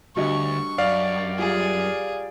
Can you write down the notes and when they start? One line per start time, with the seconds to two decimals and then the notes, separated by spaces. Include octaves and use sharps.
0.16 D2 G2 F#4 D#5 C#6
0.78 F#2 D5 F5
1.39 G3 F4 G#4